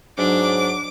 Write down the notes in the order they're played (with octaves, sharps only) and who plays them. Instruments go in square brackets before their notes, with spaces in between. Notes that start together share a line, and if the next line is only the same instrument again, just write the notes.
[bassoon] G#2 [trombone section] F#3 [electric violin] D4 [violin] D6